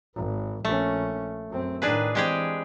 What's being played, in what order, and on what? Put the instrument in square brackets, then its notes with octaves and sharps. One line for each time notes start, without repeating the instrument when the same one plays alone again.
[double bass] G#1
[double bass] A#1 C#4 [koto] A3
[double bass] F#2 C4
[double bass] A2 D#3 [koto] D4 G#4 B4
[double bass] E3 C4 [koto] G#3 G4 G#4